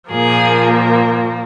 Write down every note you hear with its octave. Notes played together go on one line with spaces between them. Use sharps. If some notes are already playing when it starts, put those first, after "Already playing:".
A#2 F3 A#3 G#4